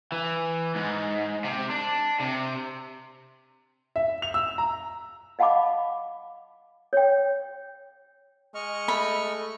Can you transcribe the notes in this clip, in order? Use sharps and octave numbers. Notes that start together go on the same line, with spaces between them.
E3
G#2
C3
D4
C3
E5
F7
E6
A#5
D#5 F5 F#5 A5 B5 D6
C#5 G5
G#3 D#5 C#6 F6
A3 B5